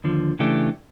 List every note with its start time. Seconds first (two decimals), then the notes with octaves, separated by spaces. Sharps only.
0.04 D#2 D3 F3
0.39 C#3 E3 A3 D4 G4